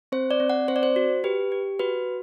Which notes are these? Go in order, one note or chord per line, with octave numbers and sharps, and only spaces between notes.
C4 C5
D5
C4
F#5
C4 C5
D5
C5
F#4
G4 B4
G4
F#4 B4